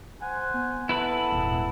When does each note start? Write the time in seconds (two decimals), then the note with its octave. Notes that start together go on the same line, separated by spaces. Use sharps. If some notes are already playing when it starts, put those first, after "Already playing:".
0.22 C5 F#5 G#5
0.54 B3
0.89 E4 G#4 A4 B4 F#5 B5
1.32 D#1 G#1